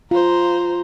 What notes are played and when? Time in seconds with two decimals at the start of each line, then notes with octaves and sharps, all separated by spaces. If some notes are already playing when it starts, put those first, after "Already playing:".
0.11 F4 C5 A#5